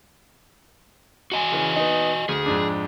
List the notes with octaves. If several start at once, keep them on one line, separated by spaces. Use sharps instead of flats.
F#4 D#5 G#5
C#3 E3
B3 D#4
D2 G#4
F2 G#2 D4